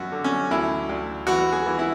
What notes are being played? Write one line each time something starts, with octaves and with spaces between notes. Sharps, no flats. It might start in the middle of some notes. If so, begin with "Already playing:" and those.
Already playing: F#2 F#4
D3
C#4
D2 E4
D2
E3 F#4
G#4
E3
E4